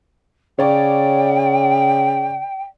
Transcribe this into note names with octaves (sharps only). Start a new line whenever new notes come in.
C#3 C#5 D5 G5